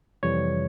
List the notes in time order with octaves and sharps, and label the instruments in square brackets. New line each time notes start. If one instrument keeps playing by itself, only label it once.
[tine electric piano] F2 C3 E3 G3 C#5